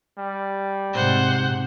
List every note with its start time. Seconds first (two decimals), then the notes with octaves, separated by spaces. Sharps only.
0.19 G3
0.94 G#2 C3 C5 F#5